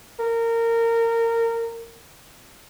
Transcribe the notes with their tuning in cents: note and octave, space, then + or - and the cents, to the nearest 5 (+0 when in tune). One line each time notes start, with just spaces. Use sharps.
A#4 -20